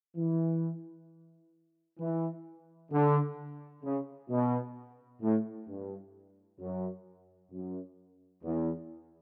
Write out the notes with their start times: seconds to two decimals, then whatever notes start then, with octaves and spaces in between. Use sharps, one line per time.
0.16 E3
2.00 E3
2.92 D3
3.84 C#3
4.30 B2
5.22 A2
5.68 G2
6.60 F#2
7.52 F#2
8.44 E2